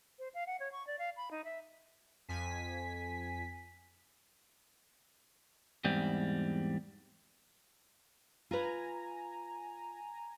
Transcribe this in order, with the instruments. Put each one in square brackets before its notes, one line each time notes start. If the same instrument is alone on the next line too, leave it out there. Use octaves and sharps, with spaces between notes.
[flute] C5
F5
F#5
C#5
C#6
D5
F5
B5
D#4
E5
[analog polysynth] F2 G#5 B6
[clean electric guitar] E2 G#2 G3 C4
[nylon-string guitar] F4 B4 [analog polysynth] G#5 A#5